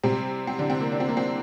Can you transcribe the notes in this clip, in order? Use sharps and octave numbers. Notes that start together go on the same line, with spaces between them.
C3 G3 C4
C4
D3 D4
C4
A#3
D4
C4
A#3
C4